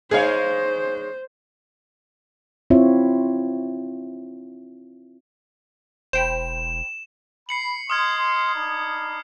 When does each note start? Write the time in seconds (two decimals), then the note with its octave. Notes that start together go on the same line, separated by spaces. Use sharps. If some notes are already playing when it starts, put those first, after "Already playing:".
0.11 G#3 D#4 G#4 C5 C#5 F5
2.70 C4 E4 F4 C#5 E5
6.13 E1 C5 G5 B5 E7
7.49 B5 C7 C#7 F#7
7.90 D#5 C6 D#6 F6 G#6
8.54 D4 D#4 B5